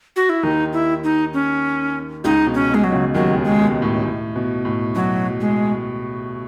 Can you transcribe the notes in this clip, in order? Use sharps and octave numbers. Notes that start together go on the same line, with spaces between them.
F#4
E4
D#2 D#3 D#4
E4
D#4
C#4
C#2 C#3 D#4
B2
C#4
B2
G#3
F#3
C#2 C#3
D#2 D#3 F#3
D#2 D#3
G#3
B2
A2
A2
B2
A2
B2 F#3
G#3